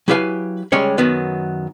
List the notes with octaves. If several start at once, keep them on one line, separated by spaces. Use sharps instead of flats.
F#3 E4 G4 B4 F5 G#5
C#2 G3 G#3 C#4 G4 C#5
F#2 D#3 F#3 B3